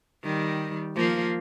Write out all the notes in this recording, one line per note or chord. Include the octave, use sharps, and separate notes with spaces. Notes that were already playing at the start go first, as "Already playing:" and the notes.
D#3 G3
F3 A#3